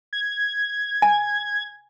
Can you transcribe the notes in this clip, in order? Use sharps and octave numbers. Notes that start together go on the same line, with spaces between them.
G#6
G#5